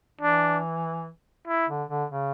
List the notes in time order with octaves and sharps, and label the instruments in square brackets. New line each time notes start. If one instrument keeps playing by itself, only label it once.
[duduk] E3 [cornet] D4
[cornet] E4
[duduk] D3
D3
C#3